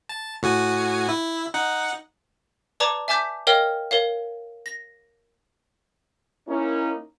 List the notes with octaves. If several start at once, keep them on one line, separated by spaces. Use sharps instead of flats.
A5
A2 F#4 G#5
E4
D#4 F#5
B4 D5 A5 A#5 D6 G#6
E5 G#5 A5 D6 G6 B6
A#4 C#5 D#5 F5 G5 F6
A#4 C#5 F5
A#6
A#3 C#4 D#4 E4